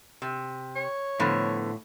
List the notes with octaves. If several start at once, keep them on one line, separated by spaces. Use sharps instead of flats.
C3
C#5
A2 D3 F3 B3